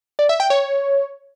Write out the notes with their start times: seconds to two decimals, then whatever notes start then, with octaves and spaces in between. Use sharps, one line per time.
0.19 D5
0.29 E5
0.40 G5
0.50 C#5